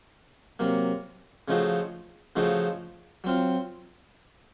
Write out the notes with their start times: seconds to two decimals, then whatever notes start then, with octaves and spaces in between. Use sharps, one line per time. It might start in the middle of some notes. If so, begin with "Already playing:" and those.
0.59 C3 F#3 A#3
1.48 C#3 F3 A3 D#4 F#4
2.36 C#3 F3 A3 D#4 F#4
3.24 F#3 C4 F4